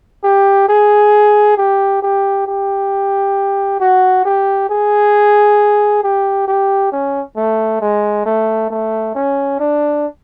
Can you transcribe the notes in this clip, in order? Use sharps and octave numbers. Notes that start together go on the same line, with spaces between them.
G4
G#4
G4
G4
G4
F#4
G4
G#4
G4
G4
C#4
A3
G#3
A3
A3
C#4
D4